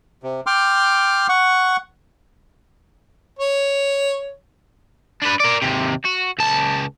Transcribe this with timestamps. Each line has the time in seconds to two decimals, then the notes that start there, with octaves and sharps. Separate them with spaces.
0.23 C3
0.46 G5 C6 D6 F6
1.29 F#5 C#6
3.39 C#5
5.22 D4 B4
5.40 A#4 D5
5.62 D#2 C3
6.05 F#4
6.39 C#2 A5